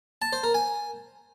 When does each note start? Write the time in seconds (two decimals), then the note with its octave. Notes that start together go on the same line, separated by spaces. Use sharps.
0.22 A5
0.33 C5
0.43 A#4
0.54 G#5